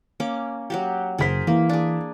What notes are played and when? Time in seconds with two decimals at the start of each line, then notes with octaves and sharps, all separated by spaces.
0.20 A#3 C#4 D6
0.70 F#3 F#4 G4
1.18 F#1 G#4 A#4 C5 B6
1.47 E3 A#3
1.69 D4 G#4